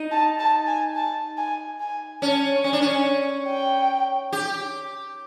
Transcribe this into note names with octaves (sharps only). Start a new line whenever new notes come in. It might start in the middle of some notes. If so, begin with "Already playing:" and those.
Already playing: D#4
A5
A5
G#5
A5
G#5
G#5
C#4 A5
C#4 G#5
D4
C#4
G5
G4